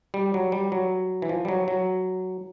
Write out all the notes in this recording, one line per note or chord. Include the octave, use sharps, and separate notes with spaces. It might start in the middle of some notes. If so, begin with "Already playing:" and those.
G3
F#3
G3
F#3
E3
F3
G3
F#3
F#3